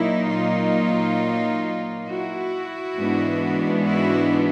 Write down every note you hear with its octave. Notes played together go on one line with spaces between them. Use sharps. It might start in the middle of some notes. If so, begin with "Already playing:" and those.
Already playing: A#2 F#3 A#3 D#4 E4
F4
E4 F#4
G#2 E3 G#3 B3 D4
E4 F#4